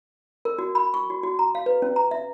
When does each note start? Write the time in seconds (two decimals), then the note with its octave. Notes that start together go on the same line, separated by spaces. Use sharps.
0.45 A#4
0.58 F#4
0.75 B5
0.94 C#6
1.10 F#4
1.23 F#4
1.39 A#5
1.55 F5
1.66 B4
1.82 C#4
1.96 A#5
2.11 E5